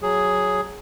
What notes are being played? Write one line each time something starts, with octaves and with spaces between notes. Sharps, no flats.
F#3 G#4